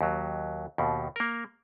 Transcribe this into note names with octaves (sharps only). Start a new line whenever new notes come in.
D#2 F#3
D#2 B2
A#3 A#4